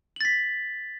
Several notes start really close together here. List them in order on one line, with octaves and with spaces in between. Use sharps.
F#7 A6 B6